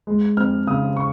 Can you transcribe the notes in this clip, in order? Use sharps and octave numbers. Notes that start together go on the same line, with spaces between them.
G#3
F2 F6
C#3 D#6
C#6